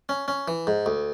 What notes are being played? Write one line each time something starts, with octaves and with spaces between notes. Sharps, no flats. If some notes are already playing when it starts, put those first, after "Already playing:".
C#4
C#4
E3
G#2
D2